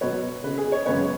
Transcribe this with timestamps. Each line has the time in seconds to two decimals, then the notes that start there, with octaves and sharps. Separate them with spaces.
0.01 B2 F#3 B3 C#5
0.44 C#3 B3 B4
0.58 G#4
0.72 C#5
0.86 F#2 C#3 G#3 B3 C#5